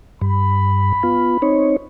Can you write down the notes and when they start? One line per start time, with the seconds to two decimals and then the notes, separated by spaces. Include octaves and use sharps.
0.22 G2 B5
1.03 B3 F4
1.42 C4 D#4 C#5